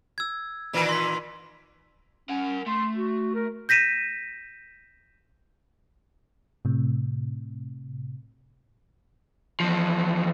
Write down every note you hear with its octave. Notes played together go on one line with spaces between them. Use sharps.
E6 G#6
A#2 D#3 E3
C6 B6
C#4 A#4 F#5
A3 C6
F#4
A#4
G6 A#6 B6 D#7 E7
A2 C3
E2 F3